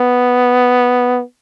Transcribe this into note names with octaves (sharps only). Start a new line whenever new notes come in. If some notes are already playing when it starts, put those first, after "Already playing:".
Already playing: B3